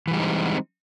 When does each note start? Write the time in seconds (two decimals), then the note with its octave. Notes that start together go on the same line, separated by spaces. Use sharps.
0.08 E3
0.11 G3
0.15 G#3
0.19 D#4
0.23 C4